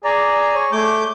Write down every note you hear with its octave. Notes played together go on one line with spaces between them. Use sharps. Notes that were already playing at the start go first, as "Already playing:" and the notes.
G#4 D5 A#5
C#5
A3 D6 G6